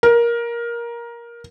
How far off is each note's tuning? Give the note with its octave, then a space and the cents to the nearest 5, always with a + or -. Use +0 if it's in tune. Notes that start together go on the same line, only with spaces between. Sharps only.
A#4 +15